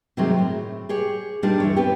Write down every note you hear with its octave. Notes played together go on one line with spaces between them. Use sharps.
C3 D#3 F#3 G#3 A3 C4
A2
G4 G#4 C#5
A#2 G3 D4 D#4 F4 G4
D2 E3 C#5
B3 C4 G4